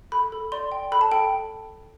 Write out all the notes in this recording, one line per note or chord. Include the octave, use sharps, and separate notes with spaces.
A4 B5
A4
D5 C6
G5
A4 B5
A5
A4 G5